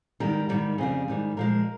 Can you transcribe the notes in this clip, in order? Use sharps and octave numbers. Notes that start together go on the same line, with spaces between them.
G#2 D#3 G3 A#4
G#2 D#3 G3
F2 C#3 G3 G#4
G#2 D#3 G3
A#2 F3 G#3 A#4